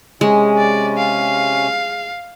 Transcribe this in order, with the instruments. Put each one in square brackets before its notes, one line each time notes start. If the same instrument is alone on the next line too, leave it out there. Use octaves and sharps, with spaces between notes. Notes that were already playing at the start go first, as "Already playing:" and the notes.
[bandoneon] C3 C#4 [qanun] G#3
[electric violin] D5
F5